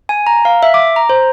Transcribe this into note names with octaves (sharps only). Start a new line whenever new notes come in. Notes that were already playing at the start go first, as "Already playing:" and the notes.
G#5
A#5
F5
E5
D6
A#5
C5